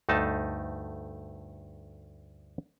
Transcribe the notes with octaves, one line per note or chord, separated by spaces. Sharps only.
D2 G2 A3 D#4 A5